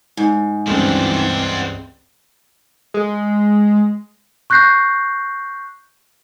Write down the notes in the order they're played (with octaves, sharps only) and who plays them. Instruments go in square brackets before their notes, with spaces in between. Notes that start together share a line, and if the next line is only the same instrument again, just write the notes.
[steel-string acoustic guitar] G#2
[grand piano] C#2 G2 [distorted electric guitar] D3 F3 [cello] E3 C4
[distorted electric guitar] C5 F#5
[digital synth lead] G#3
[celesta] C#6 F#6 G6 A#6 C7